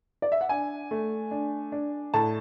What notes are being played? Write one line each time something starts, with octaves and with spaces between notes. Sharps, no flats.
D5
E5
F#5
D4 G#5
A3
D4
D4
A2 A5